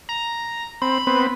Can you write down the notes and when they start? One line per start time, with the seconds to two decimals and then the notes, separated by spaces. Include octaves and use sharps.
0.09 A#5
0.82 C4 B5
1.07 B3 C4